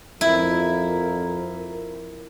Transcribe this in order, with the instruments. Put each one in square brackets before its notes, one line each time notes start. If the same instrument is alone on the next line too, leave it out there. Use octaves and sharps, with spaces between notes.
[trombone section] F2 A#4 [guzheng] E4